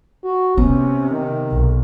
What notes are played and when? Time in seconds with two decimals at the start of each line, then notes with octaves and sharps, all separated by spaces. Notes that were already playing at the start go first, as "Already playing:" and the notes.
0.24 F#4
0.57 C3 B3 C#4
1.11 D#3
1.50 B1